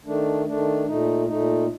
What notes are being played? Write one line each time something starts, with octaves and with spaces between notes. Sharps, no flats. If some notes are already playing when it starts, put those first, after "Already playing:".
D#3 A3 D4
D#3 A3 D4
A#2 A3 D#4
A#2 A3 D#4